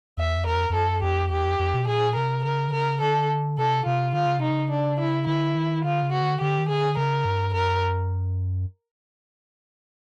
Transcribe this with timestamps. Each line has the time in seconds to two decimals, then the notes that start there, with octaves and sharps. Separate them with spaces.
0.17 E2 E5
0.36 F2
0.46 E2 A#4
0.55 F2
0.70 F2
0.74 F#2 A4
1.02 F2 G4
1.31 E2 G4
1.45 F2
1.59 F2
1.74 B2
1.87 A#2 G#4
2.15 C3 A#4
2.44 C#3 A#4
2.68 D3
2.72 C#3 A#4
3.01 D3 A4
3.58 C3 A4
3.85 C3 F4
4.13 D3 F4
4.26 C#3
4.39 C3 D#4
4.50 C#3
4.70 D4
4.99 E4
5.27 D3 E4
5.55 D#3
5.84 D3 F4
6.03 C#3
6.12 F#4
6.21 D3
6.41 D3 G4
6.58 D#3
6.69 D3 G#4
6.97 C#3 A#4
7.25 G2
7.54 F#2 A#4